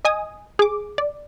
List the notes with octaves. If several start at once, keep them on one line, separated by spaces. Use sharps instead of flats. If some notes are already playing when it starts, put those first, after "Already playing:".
D#5 G#5 D#6
G#4 D6
D5